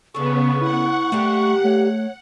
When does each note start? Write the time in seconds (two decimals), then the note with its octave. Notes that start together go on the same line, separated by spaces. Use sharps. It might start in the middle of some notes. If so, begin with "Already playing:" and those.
0.15 C#3 B3 D4 A4 C#6
0.61 E4 F#5
1.12 G3 A3 A#3 G4
1.64 A3 C#5